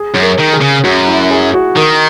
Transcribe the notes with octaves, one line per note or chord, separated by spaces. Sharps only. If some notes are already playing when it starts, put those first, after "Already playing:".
Already playing: G#4
F#2
A#4
D#3
G#4
C#3
F#2 F#4
E4
G#4
F#4
D#3 A#4